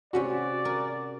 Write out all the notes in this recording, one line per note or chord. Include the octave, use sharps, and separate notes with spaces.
C3 C#4 F#4 D5 B5
A#4 G#5